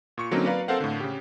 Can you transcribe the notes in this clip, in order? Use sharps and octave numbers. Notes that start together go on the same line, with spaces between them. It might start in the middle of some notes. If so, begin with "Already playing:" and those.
A#2 C#6 C#7
D3 F#3 A#3 C4 C#4 D#4
A#4 B4 D5 F5 A#5
C4 A4 A#4 C5 F5 F#5
A2 D3
C#3 G4